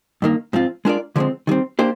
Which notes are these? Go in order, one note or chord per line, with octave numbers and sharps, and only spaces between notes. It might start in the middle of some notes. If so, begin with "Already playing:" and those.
G2 D#3 A#3
G#2 F3 C4 F4
G#3 D4 F4 A#4 D5
D3 F3 G#3 C4
D#3 G3 C4
A#3 D4 G4 C5